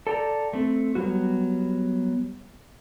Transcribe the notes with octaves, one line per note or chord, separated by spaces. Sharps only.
A4 D5 G5 A5 A#5
A3 C4
F#3 G3 B3 F#4